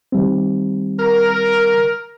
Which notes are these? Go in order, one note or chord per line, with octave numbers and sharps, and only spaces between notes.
D#3 G3 C4
A#4